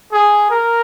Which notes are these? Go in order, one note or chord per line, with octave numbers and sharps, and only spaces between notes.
G#4
A#4